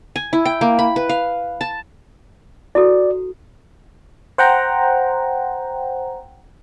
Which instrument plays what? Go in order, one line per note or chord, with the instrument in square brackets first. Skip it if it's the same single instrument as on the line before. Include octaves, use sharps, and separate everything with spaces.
[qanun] G#5
E4
G5
A#3
B5
B4
F5
A5
[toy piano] E4 F#4 A4 [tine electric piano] D5
[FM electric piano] C5 F#5 G5 A#5